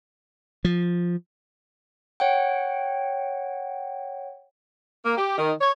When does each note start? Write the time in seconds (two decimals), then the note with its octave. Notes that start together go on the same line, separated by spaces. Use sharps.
0.65 F3
2.20 C#5 F#5 G5
5.06 A#3
5.18 G4
5.38 D#3
5.61 C#5